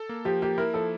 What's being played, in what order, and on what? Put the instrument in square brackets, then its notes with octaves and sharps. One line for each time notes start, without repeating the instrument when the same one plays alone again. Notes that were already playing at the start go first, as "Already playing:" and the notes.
Already playing: [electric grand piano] A4
A#3
[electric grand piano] F3 [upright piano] G4
[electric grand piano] A#3 [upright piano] G4
[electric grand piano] E4 [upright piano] A#4
[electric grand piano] F3 [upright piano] A4